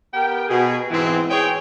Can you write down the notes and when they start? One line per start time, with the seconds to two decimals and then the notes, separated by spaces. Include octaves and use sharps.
0.14 B3 G4 A#4 G5
0.49 B2 G#4
0.91 G#2 E3 C4
1.30 G#4 C#5 G5